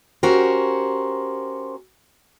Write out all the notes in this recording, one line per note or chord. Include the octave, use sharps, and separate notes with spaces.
C#4 F#4 G4 A#4 C5